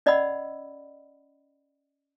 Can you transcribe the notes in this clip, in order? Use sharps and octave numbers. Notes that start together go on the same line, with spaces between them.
C#4 D5 D#5 F#5 B5 E6